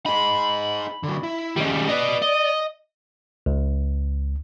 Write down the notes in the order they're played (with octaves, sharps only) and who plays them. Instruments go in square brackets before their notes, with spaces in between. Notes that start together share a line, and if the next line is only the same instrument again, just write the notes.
[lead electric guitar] D#4 G#4 [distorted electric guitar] B5
[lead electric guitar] D3 F#3
E4
[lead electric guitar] D#3 C#4 [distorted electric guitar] G3 G#3
[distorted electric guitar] B4 D#5 [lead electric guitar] D5
[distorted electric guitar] D#5
[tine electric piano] C#2